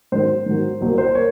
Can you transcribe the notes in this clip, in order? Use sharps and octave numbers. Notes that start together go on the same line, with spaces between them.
G#2 D#3 F#3 C5
G#2 D#3 F#3
C2 A#2 F#3 A#3
C5
A#3 C#5